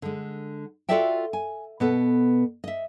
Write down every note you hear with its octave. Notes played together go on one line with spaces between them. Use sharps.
D3 G#3
F4 F#4 A4 D5 E5 G5
G#5
B2 B3 A4
D#5 E5